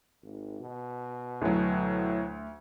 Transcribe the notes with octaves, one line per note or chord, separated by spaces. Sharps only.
G#1
B2
D2 A2 F#3